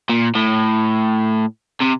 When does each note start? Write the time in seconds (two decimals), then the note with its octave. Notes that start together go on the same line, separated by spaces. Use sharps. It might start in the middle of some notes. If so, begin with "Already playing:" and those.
0.09 A#2
0.35 A2
1.80 C3